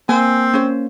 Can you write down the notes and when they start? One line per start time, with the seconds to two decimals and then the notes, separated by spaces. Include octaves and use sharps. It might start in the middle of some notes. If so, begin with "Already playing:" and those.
0.09 A#3 C4 G#5
0.53 C#4 C5